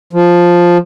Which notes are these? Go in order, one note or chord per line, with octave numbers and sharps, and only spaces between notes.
F3